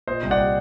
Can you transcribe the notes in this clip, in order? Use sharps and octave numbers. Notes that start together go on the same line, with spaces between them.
A#2 C5 D#5
C2
D5 F#5
G3